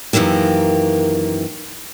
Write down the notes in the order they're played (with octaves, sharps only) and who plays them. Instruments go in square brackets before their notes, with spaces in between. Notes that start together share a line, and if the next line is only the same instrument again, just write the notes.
[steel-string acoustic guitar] F#2 D#3 E3 A#3 G4